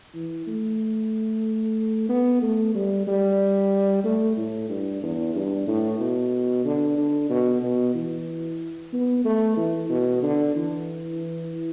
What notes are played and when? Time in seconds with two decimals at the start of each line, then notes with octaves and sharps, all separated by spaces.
0.14 E3
0.47 A3
2.09 B3
2.42 A3
2.75 G3
3.07 G3
4.04 A3
4.37 A2
4.69 G2
5.02 E2
5.35 G2
5.67 A2
6.00 B2
6.65 D3
6.97 D3
7.30 B2
7.62 B2
7.94 E3
8.93 B3
9.25 A3
9.57 E3
9.90 B2
10.22 D3
10.55 E3